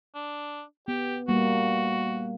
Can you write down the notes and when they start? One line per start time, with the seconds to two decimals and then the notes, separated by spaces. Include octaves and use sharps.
0.15 D4
0.88 B3 G4
1.28 G3 A#3 F#4